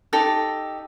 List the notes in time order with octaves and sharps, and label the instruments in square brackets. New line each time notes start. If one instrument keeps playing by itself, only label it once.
[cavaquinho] D#4 G4 A4